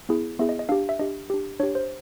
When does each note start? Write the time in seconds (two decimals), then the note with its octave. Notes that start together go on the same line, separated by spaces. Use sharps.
0.09 B3 E4 G#4
0.39 B3 E4 G#4 E5
0.49 D#5
0.59 D#5
0.69 D4 G4 F5
0.89 E5
0.99 D4 G4 D#5
1.30 D4 G4
1.60 D4 C#5
1.63 G4
1.75 C5